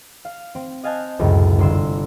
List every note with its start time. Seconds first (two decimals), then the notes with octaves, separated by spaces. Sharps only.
0.25 F5
0.55 C4
0.83 D#5 F5 G#5 A5 F#6 G6
1.19 C#2 F#2 A2 C3
1.59 G1 C6 E6